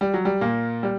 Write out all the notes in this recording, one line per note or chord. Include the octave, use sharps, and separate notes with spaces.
G3
F#3
G3
A#2 A#3
G3